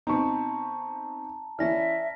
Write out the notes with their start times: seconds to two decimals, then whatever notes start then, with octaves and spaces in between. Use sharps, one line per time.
0.07 B2 C4 D#4 A5 A#5 C#6
1.59 E3 C#4 E4 D5 E5 F6 A#6